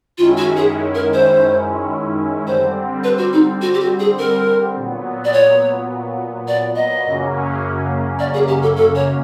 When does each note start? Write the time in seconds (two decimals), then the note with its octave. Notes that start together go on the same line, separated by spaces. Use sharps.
0.18 F#2 D#3 G#3 C#4 E4 F4
0.37 F#4
0.57 G#4
0.95 A#4
1.14 C5
2.47 D3 G3 C4 C5
3.04 B4
3.18 F#4
3.33 D#4
3.62 F#4
3.74 G4
3.80 F#4
4.00 G#4
4.19 A#4
4.75 A#2 F#3 B3
5.25 D5
5.33 C#5
6.48 D5
6.76 D#5
7.04 F#2 C#3 F#3 A#3 C#4
8.19 D5
8.34 G#4
8.48 G4
8.62 A4
8.76 A4
8.95 C#5